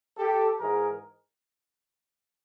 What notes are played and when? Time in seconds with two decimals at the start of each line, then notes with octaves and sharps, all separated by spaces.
0.18 G4 A4
0.60 G#2 E3 G#4 A#4